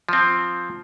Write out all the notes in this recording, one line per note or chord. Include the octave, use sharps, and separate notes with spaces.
F3 C4